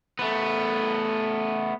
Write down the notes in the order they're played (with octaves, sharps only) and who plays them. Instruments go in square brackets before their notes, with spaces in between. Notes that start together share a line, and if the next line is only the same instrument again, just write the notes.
[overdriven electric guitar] A3 B3